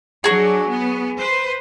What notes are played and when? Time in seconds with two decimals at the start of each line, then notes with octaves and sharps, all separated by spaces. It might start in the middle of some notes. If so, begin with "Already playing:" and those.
0.24 F#3 D4 F#4 G#4
0.68 B3
1.17 B4 C5